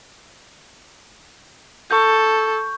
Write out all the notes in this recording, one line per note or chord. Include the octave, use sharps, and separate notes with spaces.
A4 C#6 G6